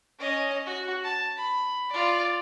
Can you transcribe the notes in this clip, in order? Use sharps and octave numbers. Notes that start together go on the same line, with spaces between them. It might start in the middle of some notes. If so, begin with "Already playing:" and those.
C#4 D#5
F#4
A5
B5
F4 D5